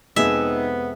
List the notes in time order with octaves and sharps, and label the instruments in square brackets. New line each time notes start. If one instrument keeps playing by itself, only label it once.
[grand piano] F2 C3 G#3 [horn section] B3 [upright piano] D#4 G#4 [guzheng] E5